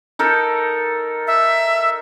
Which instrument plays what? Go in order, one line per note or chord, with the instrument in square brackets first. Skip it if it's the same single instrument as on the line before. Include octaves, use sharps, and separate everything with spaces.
[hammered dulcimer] D#4 A4 A#4
[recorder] E5